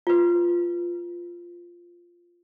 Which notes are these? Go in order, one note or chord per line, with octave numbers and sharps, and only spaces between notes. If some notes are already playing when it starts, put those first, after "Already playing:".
F4 B4